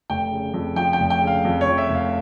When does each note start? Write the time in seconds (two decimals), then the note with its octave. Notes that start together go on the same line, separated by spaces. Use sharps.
0.10 F1 G5
0.32 C#3
0.54 F2
0.76 F3 G5
0.93 G5
1.00 F1
1.10 G5
1.22 C#3
1.27 F5
1.45 F2
1.61 C#5
1.67 F3
1.78 E5
1.90 F1 F5